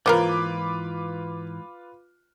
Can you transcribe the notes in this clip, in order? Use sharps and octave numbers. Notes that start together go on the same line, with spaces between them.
G#2 E3 F3 A#3 F4 A#4 B4 D6